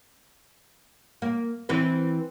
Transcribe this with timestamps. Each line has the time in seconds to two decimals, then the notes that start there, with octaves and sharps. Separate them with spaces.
1.22 A#3
1.69 E3 C4 B4